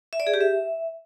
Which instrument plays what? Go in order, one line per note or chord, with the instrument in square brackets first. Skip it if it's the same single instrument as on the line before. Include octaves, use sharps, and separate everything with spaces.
[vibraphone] E5
D5
G#4
G4
E5